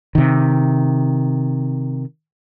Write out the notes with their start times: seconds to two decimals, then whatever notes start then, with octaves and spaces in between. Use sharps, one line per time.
0.15 C3 D#3